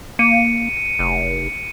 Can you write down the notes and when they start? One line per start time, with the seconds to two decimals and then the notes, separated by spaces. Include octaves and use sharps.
0.19 A#3 C#7 D#7
0.99 F1